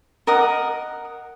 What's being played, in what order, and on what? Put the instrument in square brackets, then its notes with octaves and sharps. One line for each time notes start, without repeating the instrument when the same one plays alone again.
[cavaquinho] A#4 D#5 F#5 D#6